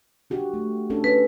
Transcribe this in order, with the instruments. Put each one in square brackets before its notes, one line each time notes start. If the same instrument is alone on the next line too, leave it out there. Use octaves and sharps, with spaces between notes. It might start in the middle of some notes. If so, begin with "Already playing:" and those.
[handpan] D4 F#4 G4
A3
C#4 D4 A4
[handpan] C#4 C#5 [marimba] B4